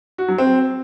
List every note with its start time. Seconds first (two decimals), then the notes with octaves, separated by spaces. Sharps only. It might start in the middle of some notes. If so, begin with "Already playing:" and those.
0.18 F#4
0.28 F#3
0.38 C4